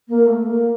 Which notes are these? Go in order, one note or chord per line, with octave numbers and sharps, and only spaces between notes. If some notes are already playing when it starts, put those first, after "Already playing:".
A#3
A3
A#3